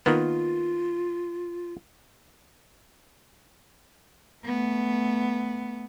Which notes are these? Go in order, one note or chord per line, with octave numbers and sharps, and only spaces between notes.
D#3 A#3 B3 F4
A3 B3